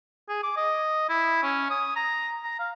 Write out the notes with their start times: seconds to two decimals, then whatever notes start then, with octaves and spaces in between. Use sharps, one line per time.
0.29 G#4
0.43 D6
0.57 D#5
1.09 E4
1.43 C#4
1.70 D#6
1.96 A#5
2.44 A#5
2.59 F5